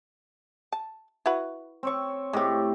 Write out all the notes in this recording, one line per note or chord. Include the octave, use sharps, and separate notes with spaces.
A5
E4 F#4 B4
C4 C#5 C#6
A2 G#3 C4 G4